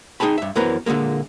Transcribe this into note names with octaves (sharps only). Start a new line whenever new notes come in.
D#4 G#4 G5 A5 B5
G2 E5
F#2 E3 B3 A#4 C5 A#5
A#2 D3 E3 G#3 A#3